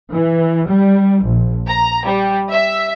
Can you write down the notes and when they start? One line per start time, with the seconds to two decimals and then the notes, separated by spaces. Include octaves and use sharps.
0.11 E3
0.67 G3
1.23 A#1
1.67 A#5
2.05 G3
2.50 E5